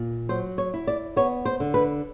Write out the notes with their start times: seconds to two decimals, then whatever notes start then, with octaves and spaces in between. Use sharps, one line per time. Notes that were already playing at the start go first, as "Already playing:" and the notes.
Already playing: A#2
0.29 F#3 C5
0.58 C#5
0.74 E4
0.87 D5
1.16 B3 C#5
1.45 C5
1.60 D3
1.74 B4